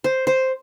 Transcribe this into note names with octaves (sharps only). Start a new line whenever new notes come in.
C5
C5